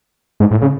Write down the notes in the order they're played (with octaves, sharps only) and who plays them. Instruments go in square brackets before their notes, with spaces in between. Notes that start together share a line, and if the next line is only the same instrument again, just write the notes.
[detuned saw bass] G#2
A2
C#3